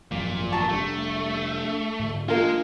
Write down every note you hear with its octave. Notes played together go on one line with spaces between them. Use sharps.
G#1 F#2 A#2 F3
A5 A#5 C#6
F1 G3 A3 D4
G#2 D3
G#3 A#3 D4 F4